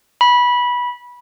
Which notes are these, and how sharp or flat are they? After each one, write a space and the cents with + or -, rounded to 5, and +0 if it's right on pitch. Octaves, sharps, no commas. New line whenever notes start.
B5 -15